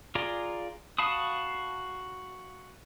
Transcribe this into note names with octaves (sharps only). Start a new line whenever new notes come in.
F4 G#4 D5 A#5
F#4 F5 A5 B5 D#6